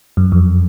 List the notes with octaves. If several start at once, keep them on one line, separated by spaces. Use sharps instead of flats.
F#2
F2